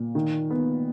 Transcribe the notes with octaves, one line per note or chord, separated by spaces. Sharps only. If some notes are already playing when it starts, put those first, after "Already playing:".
Already playing: A#2
D#3
B3